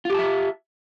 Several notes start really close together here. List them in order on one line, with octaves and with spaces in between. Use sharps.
F4 G4 A5 E5